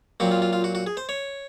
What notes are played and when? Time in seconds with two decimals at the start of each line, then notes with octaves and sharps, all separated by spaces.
0.20 A#2 F#3 C4 F#4
0.31 F4
0.42 F4
0.53 F4
0.64 F#4
0.75 F#4
0.87 G#4
0.97 C5
1.09 C#5